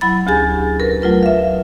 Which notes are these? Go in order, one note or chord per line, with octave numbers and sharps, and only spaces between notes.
F#3 E4 B5 A6
D2 C#4 G4 G#4 G#5 A6
A#4 B4
F#3 A3 F4 B4
E5 F5